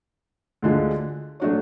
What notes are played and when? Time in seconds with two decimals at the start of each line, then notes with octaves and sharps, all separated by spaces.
0.62 D2 D3 G#3 D4 F4
1.40 F#3 A3 D4 F#4 C#5